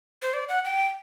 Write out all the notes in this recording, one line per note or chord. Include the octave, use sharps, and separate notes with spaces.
C5
D5
F#5
G5